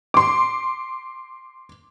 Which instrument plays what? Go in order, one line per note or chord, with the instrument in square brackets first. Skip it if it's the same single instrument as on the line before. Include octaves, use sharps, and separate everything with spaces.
[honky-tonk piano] C6 D6